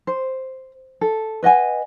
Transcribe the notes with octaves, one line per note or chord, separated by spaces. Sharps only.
C5
A4
B4 D#5 F#5 G#5